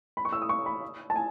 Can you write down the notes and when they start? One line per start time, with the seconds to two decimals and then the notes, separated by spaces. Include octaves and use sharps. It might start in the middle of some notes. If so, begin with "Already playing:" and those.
0.17 B5
0.25 C#6
0.33 E6
0.42 D#6
0.49 C#6
0.66 B5
1.10 A5
1.16 G#5